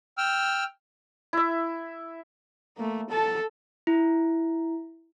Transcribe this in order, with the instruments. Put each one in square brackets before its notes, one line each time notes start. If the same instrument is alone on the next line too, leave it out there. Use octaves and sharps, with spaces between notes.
[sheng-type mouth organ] G5 E6 F6
[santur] E4 E5
[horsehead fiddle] A3 A#3
A4 A5
[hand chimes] E4